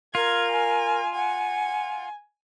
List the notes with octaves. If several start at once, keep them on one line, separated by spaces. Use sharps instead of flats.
F4 A#4 G#6
G#5
F#5 G#5